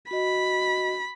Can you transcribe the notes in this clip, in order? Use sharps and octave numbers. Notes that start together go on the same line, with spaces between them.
F#4 D#5 B5